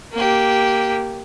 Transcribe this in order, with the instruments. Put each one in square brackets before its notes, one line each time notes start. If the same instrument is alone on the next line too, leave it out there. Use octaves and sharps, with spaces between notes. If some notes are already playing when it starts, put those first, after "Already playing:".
[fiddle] A#3 G4